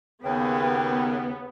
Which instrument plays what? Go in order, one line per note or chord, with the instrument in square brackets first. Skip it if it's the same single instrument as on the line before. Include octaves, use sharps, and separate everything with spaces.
[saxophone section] D#2 C#3 [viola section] B3 [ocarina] G5